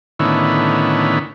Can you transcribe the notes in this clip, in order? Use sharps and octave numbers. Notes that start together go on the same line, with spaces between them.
A2 D3 D#3 B3 C#4 E4